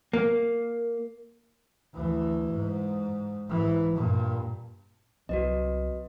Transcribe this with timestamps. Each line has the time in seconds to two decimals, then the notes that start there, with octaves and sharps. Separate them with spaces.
0.13 A#3
1.94 D2 E3
2.51 G#2
3.49 G#2 E3
3.96 G2 A#2
5.29 C2 F#3 C4 F#4 B4 D#5